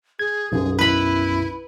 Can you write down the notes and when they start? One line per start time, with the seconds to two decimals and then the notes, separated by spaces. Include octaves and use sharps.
0.19 G#4 G#6
0.52 B1 F#2 G#4
0.79 E4 B4 B5